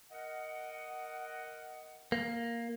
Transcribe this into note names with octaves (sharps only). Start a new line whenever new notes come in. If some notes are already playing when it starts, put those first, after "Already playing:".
A#4 D#5 F#5
A#3